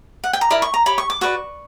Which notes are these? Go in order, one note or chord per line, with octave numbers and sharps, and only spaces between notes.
F#5
G5
A#5
E4 A#4 D5 B5
C#6
A#5
G4 C#5 B5
C#6
D6
F#4 B4 D5 C#6